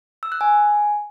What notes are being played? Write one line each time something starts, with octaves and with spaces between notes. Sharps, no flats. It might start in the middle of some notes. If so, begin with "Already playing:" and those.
E6
F#6
G#5